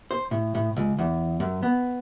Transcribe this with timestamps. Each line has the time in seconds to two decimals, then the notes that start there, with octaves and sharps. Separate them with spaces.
0.11 C5
0.31 A2
0.55 A2
0.77 C#2
0.98 E2
1.40 F#2
1.63 B3